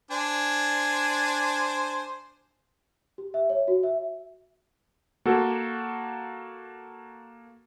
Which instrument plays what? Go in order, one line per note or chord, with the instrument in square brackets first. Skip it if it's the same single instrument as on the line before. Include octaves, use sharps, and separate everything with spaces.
[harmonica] D4 C5 G#5
[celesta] G4
E5
C#5
F#4
E5
[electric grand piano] A#3 F#4 A4